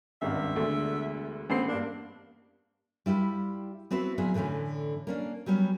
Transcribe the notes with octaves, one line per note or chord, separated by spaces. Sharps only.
G#1 C#2 G2 E5
E1 D2 D3
A1 B3 C4 C7
G2 A#3 D4
G3 E4 F4 G4
B3 C4 E4 F#4 B4
A#2 F#3 B3 E4 G#4
A2 D3 E3 A3 C#4
A#3 C#4 D4
F#3 G3 B3 C#4